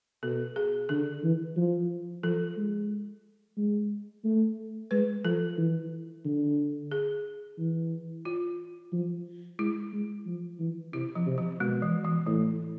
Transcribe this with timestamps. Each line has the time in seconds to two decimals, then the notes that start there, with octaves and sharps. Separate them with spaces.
0.23 B2 A4
0.56 G#4
0.89 D3 A4
1.23 E3
1.56 F3
2.23 F3 A4
2.57 G#3
3.57 G#3
4.24 A3
4.91 G#3 B4
5.24 F3 A4
5.58 E3
6.25 D3
6.92 G#4
7.58 E3
8.25 F4
8.93 F3
9.59 G#3 E4
9.92 G#3
10.26 F3
10.59 E3
10.93 C3 E4
11.15 F3
11.26 C3
11.38 F3
11.60 B2 G#3
11.82 E3
12.04 E3
12.27 A2 E3